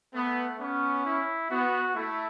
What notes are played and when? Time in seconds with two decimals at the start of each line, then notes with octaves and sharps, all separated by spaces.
0.14 A3 B3
0.60 B3 C#4
1.05 E4
1.51 B3 F#4
1.96 A3 E4